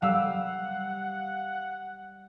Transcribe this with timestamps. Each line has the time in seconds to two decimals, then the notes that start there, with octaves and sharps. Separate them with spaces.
0.02 G3 F5 F#5 E6